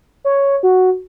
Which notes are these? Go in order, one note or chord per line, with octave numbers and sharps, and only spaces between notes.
C#5
F#4